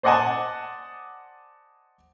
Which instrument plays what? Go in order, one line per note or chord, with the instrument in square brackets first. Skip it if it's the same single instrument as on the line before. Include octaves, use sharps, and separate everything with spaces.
[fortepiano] C5 D5 D#5 F#5 G#5 A5